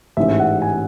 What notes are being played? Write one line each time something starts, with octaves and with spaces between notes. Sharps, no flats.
A1 G#2 E3 E5
F#5
G#5